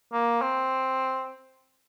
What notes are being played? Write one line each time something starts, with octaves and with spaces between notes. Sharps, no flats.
A#3
C4